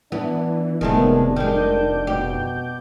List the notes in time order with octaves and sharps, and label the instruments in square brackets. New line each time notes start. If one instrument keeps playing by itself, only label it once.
[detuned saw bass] E3 [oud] B3 [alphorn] D4
[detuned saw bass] F1 [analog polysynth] C3 B3 [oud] D#3 G#3 A3 [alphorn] D4
[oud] D#3 G#3 [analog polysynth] D6 G6
[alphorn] B2 [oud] G4